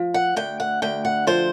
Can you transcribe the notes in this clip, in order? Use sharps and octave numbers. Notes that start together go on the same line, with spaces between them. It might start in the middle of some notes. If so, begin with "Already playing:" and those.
Already playing: F3
F#5
D2 G5
F#5
D2 G5
F#5
F3 C5